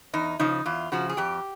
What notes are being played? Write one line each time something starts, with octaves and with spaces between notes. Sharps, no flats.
E2 D#4
C#3 F3 D#4
E2 F4
C#3 F3 F#4
G#4
F2 G4